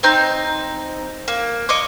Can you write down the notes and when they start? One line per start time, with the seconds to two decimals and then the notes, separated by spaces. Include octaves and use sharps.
0.03 C4 D#4 G6
1.28 A#3
1.69 C#5 D#5 D6